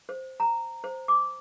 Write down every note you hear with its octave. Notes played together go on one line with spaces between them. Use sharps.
C5
A#5
C5
D6